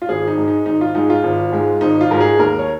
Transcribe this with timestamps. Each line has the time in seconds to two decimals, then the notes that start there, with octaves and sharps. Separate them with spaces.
0.02 F4
0.09 G#1 G#4
0.27 D#4
0.38 G#2 G#3
0.48 D#4
0.66 G#1 D#4
0.81 F4
0.95 G#2 G#3 D#4
1.10 F4
1.24 G#1
1.53 G#2 G#3
1.81 G#1 D#4
2.01 F4
2.11 G#2 G#3 A#4
2.21 G#4
2.39 D#2 A#4
2.59 C#5